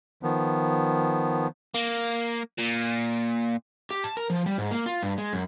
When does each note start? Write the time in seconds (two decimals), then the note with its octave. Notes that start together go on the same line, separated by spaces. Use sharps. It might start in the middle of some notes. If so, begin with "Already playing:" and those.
0.23 D#3 F3 B3
1.74 A#3
2.58 A#2
3.91 G4
4.04 A5
4.17 A#4
4.30 F3
4.46 G3
4.58 G#2
4.71 A#3
4.86 F4
5.02 G2
5.18 G#3
5.33 F#2